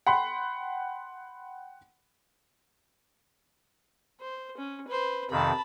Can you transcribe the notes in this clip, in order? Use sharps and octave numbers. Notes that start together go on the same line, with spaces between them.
F#5 G5 B5 C6
C5
C#4
B4 C5
F2 C3 D#3 A5 B5